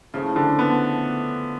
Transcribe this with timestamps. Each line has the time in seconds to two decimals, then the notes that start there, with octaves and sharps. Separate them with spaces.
0.14 A2 C#3 F3 A3 C#4
0.36 D3
0.59 B3